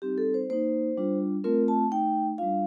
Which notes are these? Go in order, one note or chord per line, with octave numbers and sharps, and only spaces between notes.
G3 C4 D#4 G4
A4
C5
A#3 D#4 C5
G3 D4 F4
A3 C4 F4 A#4
A5
A3 D#4 G5
G3 D4 F4 F5